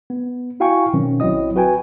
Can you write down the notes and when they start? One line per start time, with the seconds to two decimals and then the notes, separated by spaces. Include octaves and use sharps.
0.10 B3
0.60 E4 F#4 F5 G5 G#5 C#6
0.93 B2 D#3 F#3 C4 C#4
1.20 A1 F#3 C4 E4 D#5 D#6
1.56 F#4 B4 G5 G#5